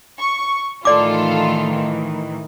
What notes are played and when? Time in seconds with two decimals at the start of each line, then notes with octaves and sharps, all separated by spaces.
0.19 C#6
0.85 A2 D#3 E3 F4 A4 D5 D6